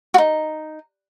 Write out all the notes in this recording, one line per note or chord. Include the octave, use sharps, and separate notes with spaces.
D#4 F#4